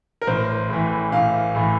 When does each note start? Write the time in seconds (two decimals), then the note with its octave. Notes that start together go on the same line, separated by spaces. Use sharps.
0.22 A#4
0.27 A1 C5
0.69 A2 E3
1.12 A1 F5
1.55 A2 E3